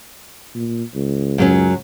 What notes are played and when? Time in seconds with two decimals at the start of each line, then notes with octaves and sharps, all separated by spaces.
0.54 A#2
0.95 C#2
1.38 F#2 F#3 C#4